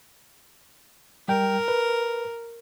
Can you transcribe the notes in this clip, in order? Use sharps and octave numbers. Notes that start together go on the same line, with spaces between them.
G3 A#4 G5
B4